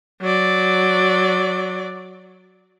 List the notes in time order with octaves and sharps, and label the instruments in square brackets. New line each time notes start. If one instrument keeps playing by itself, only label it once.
[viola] F#3 D5